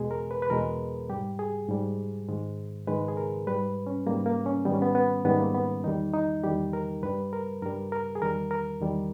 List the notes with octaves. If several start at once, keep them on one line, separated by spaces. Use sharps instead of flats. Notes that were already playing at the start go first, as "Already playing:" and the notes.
Already playing: E2 B2 G#3 G#4
A#4
B4
B4
E2 B2 G#3 A#4
G#2 G3 G4
G#4
G#2 G3
G#2 D#3 G#3
G#2 D#3 G#3 B4
G#4
A#4
G#2 G3 B4
C#4
G#2 G3 A#3
A#3
C#4
G#2 D#3 G3 B3
C#4
B3
B3
G#2 D#3 G3 B3
A#3
B3
E2 D#3 G3 D#4
D#4
E2 D#3 G3 G4
A#4
G2 G3 B4
A#4
G2 G3 A#4
A#4
G#4
E2 D#3 G3 A#4
A#4
E2 D#3 G3